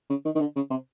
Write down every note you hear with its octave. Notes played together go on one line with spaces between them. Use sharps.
C#3
D#3
D#3
D3
C#3
C3